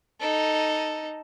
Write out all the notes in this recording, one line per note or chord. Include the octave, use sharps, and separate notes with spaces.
D#4 A4